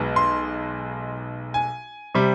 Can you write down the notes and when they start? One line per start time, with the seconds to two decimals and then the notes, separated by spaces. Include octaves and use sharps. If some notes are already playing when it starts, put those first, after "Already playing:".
Already playing: B1 B2 G#3
0.16 C6
1.54 G#5
2.15 C3 G3